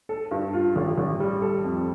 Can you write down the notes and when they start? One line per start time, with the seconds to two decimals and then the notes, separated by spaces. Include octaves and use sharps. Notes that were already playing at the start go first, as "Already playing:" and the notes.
0.09 A4
0.31 G2
0.53 F4
0.76 A1
0.98 A1
1.20 G3
1.42 A4
1.64 F2